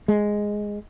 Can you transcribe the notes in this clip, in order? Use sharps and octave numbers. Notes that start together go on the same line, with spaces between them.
G#3